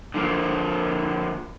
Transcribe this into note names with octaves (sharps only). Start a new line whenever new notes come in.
D3 F3 A#3